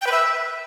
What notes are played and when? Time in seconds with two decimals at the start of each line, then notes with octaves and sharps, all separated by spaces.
0.01 G5
0.07 B4
0.12 E5